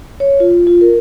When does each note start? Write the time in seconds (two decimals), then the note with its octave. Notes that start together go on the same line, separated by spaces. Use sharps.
0.20 C#5
0.40 F4
0.67 F4
0.81 A#4